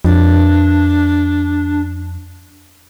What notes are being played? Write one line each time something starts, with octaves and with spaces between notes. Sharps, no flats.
F2 D4